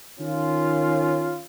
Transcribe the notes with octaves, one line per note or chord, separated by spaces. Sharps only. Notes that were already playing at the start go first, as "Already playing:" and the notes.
D#3 C#4 F4